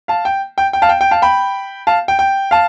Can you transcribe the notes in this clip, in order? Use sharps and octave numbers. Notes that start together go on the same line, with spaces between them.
F5 A5
G5
G5
G5
F5 A5
G5
G5
F5 A5
G5 B5
F5 A5
G5
G5
F5 A5